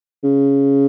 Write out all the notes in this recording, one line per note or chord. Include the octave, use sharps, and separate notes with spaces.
C#3